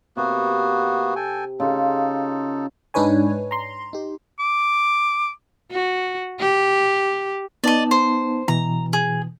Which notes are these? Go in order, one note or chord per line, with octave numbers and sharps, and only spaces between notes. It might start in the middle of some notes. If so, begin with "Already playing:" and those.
C3 A#3 B3 F#4
A4 G5 G#5
C#3 D#4 F4 A4
G#2 D4 D#4 B4 C#5 G#5
A#5 C6
D#4 G4
D6
F#4
G4
B3 D#4 D5 D#5 A5
C5
B2 E3 A#5
G#4